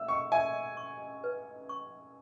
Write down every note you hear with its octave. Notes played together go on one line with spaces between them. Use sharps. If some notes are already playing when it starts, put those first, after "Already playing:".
Already playing: E5 E6
C#6
E5 G#5
C#6
B4
C#6